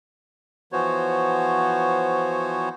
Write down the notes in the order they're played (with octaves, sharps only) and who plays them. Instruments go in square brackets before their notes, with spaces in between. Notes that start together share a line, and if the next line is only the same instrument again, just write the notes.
[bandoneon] E3 F3 B3 F#4 C5 C#5